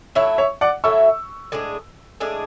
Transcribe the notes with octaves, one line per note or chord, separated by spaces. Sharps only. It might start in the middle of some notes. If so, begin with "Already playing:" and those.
F#3 A3 E4 C#5 E5
C#5 E5
D5 F#5
F#3 A3 E4 C#6 E6
A2 G#3 D4 G#4
A2 G#3 D4 G#4